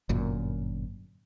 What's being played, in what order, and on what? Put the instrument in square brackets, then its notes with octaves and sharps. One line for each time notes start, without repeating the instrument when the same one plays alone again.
[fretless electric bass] G1 F#2 A#2